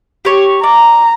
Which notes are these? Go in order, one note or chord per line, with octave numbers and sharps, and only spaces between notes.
G4 C#5
D5 A#5